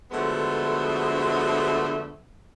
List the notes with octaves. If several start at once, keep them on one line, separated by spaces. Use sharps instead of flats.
D3 F3 F#3 G#3 A3 B3